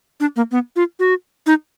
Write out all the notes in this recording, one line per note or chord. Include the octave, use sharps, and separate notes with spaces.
D4
A#3
B3
F4
F#4
D#4